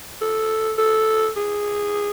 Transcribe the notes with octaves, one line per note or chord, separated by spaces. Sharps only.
A4
A4
G#4